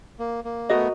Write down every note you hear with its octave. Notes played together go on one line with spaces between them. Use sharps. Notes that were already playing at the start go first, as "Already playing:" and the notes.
A#3
A#3
A3 B3 F#4 A#4 D#5